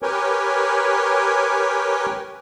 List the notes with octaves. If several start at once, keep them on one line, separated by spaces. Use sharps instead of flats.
G4 A#4 B4 C#5 G5 G#5